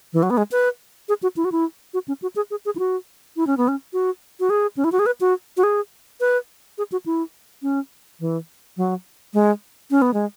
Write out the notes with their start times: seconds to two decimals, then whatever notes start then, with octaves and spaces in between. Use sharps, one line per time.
0.13 E3
0.23 F#3
0.30 B3
0.37 G#3
0.51 B4
1.09 G#4
1.23 F#4
1.37 E4
1.45 F#4
1.52 E4
1.94 F#4
2.08 C#4
2.22 F#4
2.36 G#4
2.51 G#4
2.65 G#4
2.76 E4
2.79 F#4
3.36 E4
3.47 C#4
3.57 B3
3.68 C#4
3.93 F#4
4.40 F#4
4.50 G#4
4.77 C#4
4.84 E4
4.92 F#4
4.99 G#4
5.06 B4
5.21 F#4
5.57 F#4
5.63 G#4
6.20 B4
6.78 G#4
6.92 F#4
7.06 E4
7.62 C#4
8.20 E3
8.77 F#3
9.34 G#3
9.91 C#4
10.02 B3
10.14 G#3